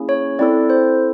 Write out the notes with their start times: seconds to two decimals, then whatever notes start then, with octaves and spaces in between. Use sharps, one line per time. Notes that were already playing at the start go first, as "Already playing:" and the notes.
Already playing: A#3 C#4 E4 G#4
0.09 C#5
0.39 C4 E4 A4 D5
0.70 C5